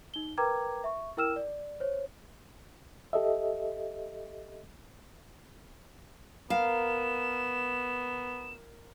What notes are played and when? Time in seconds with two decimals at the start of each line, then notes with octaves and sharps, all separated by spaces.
0.14 D#4 G7
0.38 A#4 B4 G5 A#5 D6 G#6
0.84 E5 C#6
1.17 E4 A#4 G5 E6 F6 E7
1.36 D5
1.80 C5 C#5
3.13 G4 A4 D#5 E5
6.50 B3 A#4 F5 E7